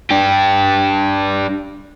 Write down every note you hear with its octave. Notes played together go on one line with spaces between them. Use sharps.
D4 G4